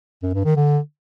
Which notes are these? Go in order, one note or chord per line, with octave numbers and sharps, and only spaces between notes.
F#2
G2
D#3
D3